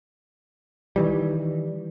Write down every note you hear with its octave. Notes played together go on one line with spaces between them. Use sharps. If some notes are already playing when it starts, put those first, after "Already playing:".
D#3 E3 G3